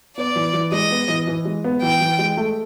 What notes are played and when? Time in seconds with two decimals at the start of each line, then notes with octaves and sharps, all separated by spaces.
0.17 B3 D5
0.36 E3
0.53 E3
0.72 G#3 D#5
0.91 B3
1.09 E3
1.27 E3
1.45 G#3
1.64 B3
1.82 E3 G5
2.01 E3
2.19 G#3
2.37 A3